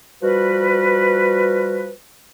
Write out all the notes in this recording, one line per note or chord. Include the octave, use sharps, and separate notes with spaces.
F3 G3 F#4 B4